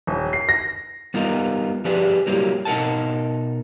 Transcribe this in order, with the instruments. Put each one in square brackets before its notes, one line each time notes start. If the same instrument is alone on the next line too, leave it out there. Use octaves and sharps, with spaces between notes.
[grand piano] D#1
C7
A#6
[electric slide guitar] G3 B3 D#4 F4 A#4
F3 G4 G#4 B4 D5
F#3 G3 A#3 E4 G4
B2 D#4 A#4 F#5 A5